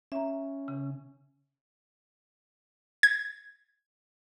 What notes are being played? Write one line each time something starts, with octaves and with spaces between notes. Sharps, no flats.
C#4 E5 A#5
C#3
G#6